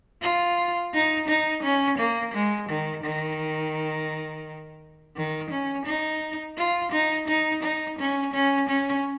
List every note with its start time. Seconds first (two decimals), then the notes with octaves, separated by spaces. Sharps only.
0.22 F4
0.93 D#4
1.28 D#4
1.63 C#4
1.98 A#3
2.34 G#3
2.69 D#3
3.04 D#3
5.16 D#3
5.51 C#4
5.86 D#4
6.57 F4
6.92 D#4
7.28 D#4
7.63 D#4
7.99 C#4
8.34 C#4
8.69 C#4